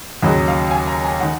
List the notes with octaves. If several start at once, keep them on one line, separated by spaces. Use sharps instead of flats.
D#2 C#3 F#3 D#5
F5
G#5
A#5
G#5
D#3 F#5